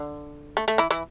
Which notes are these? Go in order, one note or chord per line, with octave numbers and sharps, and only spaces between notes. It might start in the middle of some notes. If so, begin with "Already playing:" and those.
Already playing: D3
A3
A3
E3 E4
E3 E4